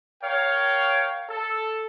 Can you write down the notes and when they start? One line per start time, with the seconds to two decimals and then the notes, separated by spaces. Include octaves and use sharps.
0.23 A#4 C#5 F5 G5
1.29 A4